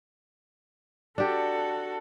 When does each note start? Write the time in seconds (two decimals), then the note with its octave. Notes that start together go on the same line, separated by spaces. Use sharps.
1.18 D4 F#4 G4 A4